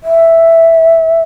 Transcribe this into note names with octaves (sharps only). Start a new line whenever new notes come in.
E5